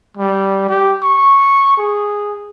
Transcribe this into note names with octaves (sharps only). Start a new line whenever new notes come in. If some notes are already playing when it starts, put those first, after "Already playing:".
G3
G4
C#6
G#4